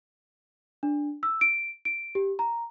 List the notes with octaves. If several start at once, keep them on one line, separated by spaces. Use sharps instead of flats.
D4
E6
D7
D7
G4
A#5